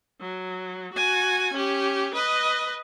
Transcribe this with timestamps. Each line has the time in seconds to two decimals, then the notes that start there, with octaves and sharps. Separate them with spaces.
0.21 F#3
0.94 F#4 G#5
1.53 C#4 G4
2.14 B4 D#5